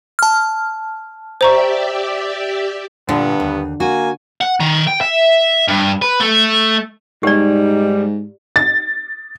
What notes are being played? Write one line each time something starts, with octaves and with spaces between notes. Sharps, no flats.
A5 F6
G4 C5 D5 E5 A#5 C#6
G2 A#2 D3 B3
D#2
A#3 F#4 G#5
F#5
D#3
G5
E5
G2
B4
A3
G#2 G3 D#4 G4 D5
A6